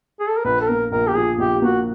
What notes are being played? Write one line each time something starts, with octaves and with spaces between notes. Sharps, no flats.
G#4
A4
A#4
A#1 B4
A4
A#3 A#4
A#1 A#4
G4
F3 G#4
A#1 G4
A#3 F#4